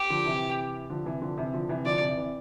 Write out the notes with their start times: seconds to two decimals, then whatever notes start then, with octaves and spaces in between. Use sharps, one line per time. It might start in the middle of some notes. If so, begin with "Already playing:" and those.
Already playing: G4
0.10 D3 F3
0.25 C3 E3
0.90 D3 F3
1.05 C3 E3
1.22 D3 F3
1.37 C3 E3
1.54 D3 F3
1.69 C3 E3
1.85 D3 F3 D5
2.01 C3 E3
2.17 C3 E3